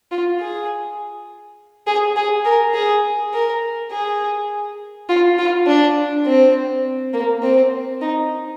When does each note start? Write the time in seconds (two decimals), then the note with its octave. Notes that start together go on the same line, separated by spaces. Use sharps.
0.11 F4
0.40 G#4
1.87 G#4
2.16 G#4
2.45 A#4
2.74 G#4
3.34 A#4
3.91 G#4
5.09 F4
5.39 F4
5.67 D4
6.26 C4
7.13 A#3
7.42 C4
8.01 D#4